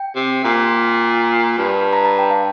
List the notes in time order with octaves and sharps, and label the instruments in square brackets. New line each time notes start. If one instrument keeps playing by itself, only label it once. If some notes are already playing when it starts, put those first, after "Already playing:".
Already playing: [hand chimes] G5
[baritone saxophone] C3
A#2
G2
[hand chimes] A#5
A5
G5
F5